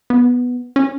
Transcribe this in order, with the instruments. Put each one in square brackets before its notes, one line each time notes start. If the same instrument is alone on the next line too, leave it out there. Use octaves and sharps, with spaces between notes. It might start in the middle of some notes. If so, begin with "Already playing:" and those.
[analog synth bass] B3
C#4